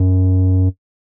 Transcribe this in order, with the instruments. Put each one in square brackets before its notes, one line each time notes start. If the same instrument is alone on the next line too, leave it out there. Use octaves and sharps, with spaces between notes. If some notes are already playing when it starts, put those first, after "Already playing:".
Already playing: [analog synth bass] F#2